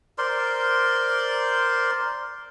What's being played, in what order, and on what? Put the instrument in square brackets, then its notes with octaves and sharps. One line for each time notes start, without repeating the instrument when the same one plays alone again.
[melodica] A#4 C5 D5 C6